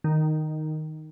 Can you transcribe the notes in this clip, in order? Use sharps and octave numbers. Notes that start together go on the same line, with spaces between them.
D#3